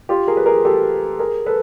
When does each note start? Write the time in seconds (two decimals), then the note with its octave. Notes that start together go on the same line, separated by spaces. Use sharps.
0.09 F4 G4
0.28 G#4 A#4
0.37 B4
0.46 G#4 A#4
0.65 G4 A4
1.19 G#4 A#4
1.46 A4 B4